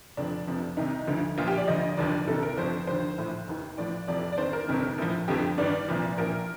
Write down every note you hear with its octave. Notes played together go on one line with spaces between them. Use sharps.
F1 F2 D3 F3 D4
F1 F2 C3 F3
C2 C3 D#3 D#4
D2 D3 F3
A#1 A#2 F3 F4
G4
D5
D2 D3 F3 D#5
F1 D#2 D3 F3 D5
C2 C3 D#3 A4
A#4
G1 F2 D3 F3 C5
D#2 D3 F3 C5
A#1 A2 F3
F1 D#2 D#3
A1 A2 F3 D5
F1 F2 C3 F3 D5
D5
G1 F2 D#3 C5
A#4
G1 F2 C3 D#3
A#1 A2 F3
G1 F2 D3 F3 G4
G1 G2 D#3 D5
C2 A#2 F3
A#1 A#2 F3 A#4